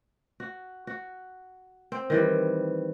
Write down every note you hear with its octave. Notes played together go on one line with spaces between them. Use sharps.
F#4
F#4
C4
D#3 E3 G3